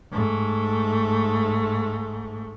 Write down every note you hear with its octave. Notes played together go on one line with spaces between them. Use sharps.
G#2 A3